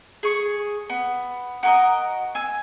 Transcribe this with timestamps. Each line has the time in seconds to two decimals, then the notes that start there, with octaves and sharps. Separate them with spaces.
0.23 G#4 C#6
0.90 B3
1.63 F#4 A#4 D#5
2.35 G#5 E6